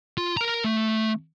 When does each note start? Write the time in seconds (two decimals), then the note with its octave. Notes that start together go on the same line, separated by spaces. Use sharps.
0.17 F4
0.37 A#4 A#5
0.64 A3